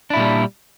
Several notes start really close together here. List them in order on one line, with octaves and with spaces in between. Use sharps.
D4 E4 A#2 G3